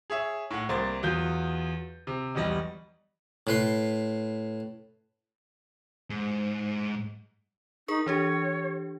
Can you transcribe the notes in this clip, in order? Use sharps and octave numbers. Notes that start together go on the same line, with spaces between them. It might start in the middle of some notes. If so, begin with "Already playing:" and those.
G#4 C#5 E5
A2 F#5
C2 A#3 C5 A6
E2 F#3 F4 G6
C3
B1 E2 G3 D#5
A2 B4 C6
G#2
D#4 G#4 A#4 C#6
E3 D4 G4 C#5